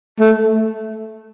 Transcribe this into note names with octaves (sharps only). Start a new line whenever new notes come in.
A3